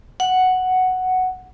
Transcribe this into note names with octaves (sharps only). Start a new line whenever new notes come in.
F#5